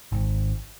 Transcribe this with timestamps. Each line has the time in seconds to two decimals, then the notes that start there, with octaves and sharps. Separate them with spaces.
0.12 G#1